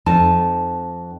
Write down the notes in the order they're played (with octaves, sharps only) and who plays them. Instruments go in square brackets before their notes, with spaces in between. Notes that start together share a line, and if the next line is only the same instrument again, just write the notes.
[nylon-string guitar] F2 D#4 A5